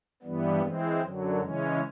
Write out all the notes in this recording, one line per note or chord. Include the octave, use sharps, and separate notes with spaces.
G2 E3 G3 B3
E3 G#3 C4
F#2 D3 F#3
C#3 E3 G#3 C#4